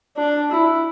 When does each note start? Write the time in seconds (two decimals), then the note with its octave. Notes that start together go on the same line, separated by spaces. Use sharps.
0.17 D4
0.51 E4